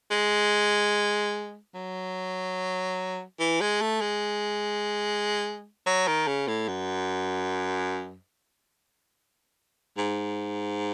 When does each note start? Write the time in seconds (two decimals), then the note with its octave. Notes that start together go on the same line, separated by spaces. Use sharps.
0.11 G#3
1.75 F#3
3.39 E3
3.61 G#3
3.81 A3
4.01 G#3
5.86 F#3
6.07 D#3
6.27 C#3
6.48 A2
6.68 F#2
9.97 G#2